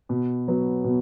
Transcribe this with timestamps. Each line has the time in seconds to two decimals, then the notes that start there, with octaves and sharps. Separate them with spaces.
0.09 B2
0.48 F#3 B3
0.84 B2